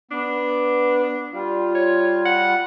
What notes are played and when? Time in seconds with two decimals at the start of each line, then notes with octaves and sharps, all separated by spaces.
0.11 B3 D4
1.33 G3 F4
1.75 C#5
2.26 F#5